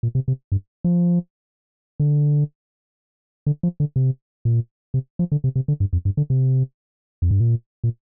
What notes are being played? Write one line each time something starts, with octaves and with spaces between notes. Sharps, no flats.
A#2
C3
C3
G2
F3
D3
D3
F3
D3
C3
A#2
C3
F3
D3
C3
C3
D3
G2
F2
G2
D3
C3
F2
G2
A#2
A#2